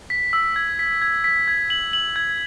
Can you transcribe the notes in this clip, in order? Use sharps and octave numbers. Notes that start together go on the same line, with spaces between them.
B6
E6
G#6
B6
G#6
B6
G#6
F#7
F#7
G#6